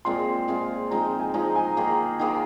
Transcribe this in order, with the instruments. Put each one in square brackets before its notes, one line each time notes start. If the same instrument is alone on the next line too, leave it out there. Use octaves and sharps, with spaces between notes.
[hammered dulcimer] A#2 G#3 C4 F4 [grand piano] C6
[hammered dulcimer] A#2 G#3 C4 F4
[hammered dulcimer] F3 G#3 C4 D#4 [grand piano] A#5
[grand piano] G#5
[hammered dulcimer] F3 G#3 C4 D#4 [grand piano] G#5
[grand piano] A#5
G#5
A#5
[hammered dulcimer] D#3 A#3 G#4 C5 [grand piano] G#5
[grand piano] A#5
G#5
[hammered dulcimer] D#3 A#3 G#4 C5